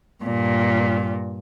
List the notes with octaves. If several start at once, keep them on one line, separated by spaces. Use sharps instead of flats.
G2 A#2